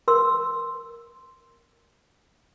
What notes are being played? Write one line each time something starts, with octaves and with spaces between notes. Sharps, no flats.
A#4 C6 E6